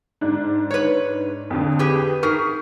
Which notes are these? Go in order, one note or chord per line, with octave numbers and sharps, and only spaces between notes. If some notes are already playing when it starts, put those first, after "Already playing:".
G#2 D4
B4 C#5
F2 D3
G4 G#4 B4
D#4 G#4 A#4 C#6 B6